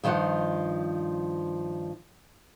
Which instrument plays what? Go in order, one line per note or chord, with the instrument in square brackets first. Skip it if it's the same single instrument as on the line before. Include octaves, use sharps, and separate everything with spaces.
[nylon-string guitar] G2 D#3 F3 D#4 F#5